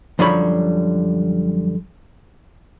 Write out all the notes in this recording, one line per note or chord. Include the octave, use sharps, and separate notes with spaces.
F#2 D3 F3 G3 C#5 B5